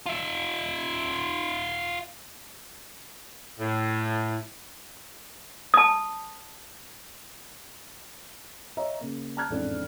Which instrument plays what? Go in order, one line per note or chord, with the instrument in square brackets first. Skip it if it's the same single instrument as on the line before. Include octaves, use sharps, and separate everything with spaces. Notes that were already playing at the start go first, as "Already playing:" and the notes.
[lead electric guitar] F4 E5
[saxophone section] A2
[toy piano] A5 D#6
[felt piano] C#5 D#5 E5 A#5
C#3 A#3
A5 A#5 F6 F#6 G#6
A1 F2 G#2 D4 A4